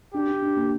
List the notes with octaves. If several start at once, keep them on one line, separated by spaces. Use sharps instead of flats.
D4 G4
D4
D4
A#3